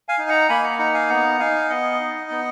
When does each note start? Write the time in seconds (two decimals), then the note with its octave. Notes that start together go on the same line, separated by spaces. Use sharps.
0.09 F5 G#5
0.18 D#4
0.29 F#5 A#5
0.49 A#3 G#5 B5
0.64 F#5 A#5
0.79 D#4 F#5 A#5
0.94 F5 G#5
1.09 B3 F#5 A#5
1.39 D#4 F5 G#5
1.69 B3 D#5 F#5
2.00 D#4
2.31 B3